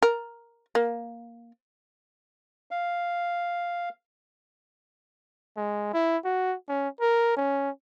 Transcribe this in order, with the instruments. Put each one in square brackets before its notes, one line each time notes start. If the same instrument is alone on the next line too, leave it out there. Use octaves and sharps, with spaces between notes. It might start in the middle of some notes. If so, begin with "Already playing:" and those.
[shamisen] A#4
A#3
[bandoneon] F5
[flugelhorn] G#3
E4
F#4
C#4
A#4
C#4